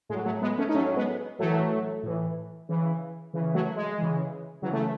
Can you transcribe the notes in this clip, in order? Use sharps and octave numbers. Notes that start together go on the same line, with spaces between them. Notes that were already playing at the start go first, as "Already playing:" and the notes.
A2 F#3 G#3
F#3 A3
G#3 B3
A3 C#4
D#4
A2 F#3 A3 C#4
G#3 B3
A2 E3 F#3 A3
A2 E3
C#3 E3
C#3 E3
F#3 A3
G#3
C#3 E3
C#3 E3 F#3
A3